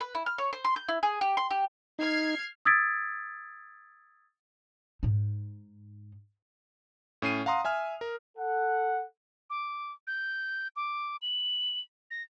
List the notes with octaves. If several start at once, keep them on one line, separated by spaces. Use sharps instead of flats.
B4
E4
F6
C#5
C5
C6
G6
E4
G#4
G4
C6
G4
D#4 F6 G#6 C7
D#6 E6 G#6 A6 B6 D7
G#2 D#4
A2 C#4 C7 D#7
F5 F#5 A#5 C6 D#6
E5 G#5 F6
A#4
A4 F#5
D6
G6
D6
F#7
A#6